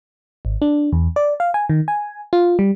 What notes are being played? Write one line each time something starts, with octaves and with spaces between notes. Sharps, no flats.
G#1
D4
E2
D5
F5
G#5
D#3
G#5
F4
G3